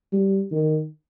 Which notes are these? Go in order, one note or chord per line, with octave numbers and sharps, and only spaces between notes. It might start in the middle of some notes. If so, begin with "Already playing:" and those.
G3
D#3